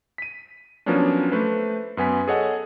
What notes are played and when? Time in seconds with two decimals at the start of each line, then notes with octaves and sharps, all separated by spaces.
0.18 B6 D#7
0.86 F3 F#3 A#3 B3 C#4 D4
1.32 A3 B4 C5
1.97 F#2 B3 G#5 B6
2.28 G#4 A4 C#5 D#5 F#5